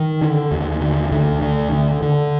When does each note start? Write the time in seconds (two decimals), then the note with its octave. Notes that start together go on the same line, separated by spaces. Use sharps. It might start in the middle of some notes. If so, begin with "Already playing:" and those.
Already playing: D#3
0.21 D3
0.51 D#2
0.81 D3
1.12 D2 D3
1.42 D3
1.72 D3
2.02 D3